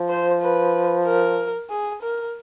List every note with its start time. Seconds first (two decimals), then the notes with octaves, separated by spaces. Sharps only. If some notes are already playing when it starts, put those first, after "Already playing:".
Already playing: F3
0.09 C5
0.41 B4
1.05 A#4
1.70 G#4
2.02 A#4